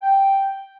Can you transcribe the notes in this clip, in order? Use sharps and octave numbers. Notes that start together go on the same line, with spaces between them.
G5